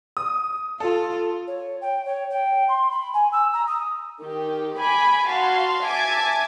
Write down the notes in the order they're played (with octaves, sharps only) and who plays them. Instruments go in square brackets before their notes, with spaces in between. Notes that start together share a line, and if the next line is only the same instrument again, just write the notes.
[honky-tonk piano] D#6
[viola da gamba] F4 [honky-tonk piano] A4
[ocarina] C#5
G5
C#5
G5
C6
B5
G#5
E6
A#5
D#6
[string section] D#3 G4
G#5 B5 D6
F#4 F5 A5 C6
E5 G#5 A5 D6 G#6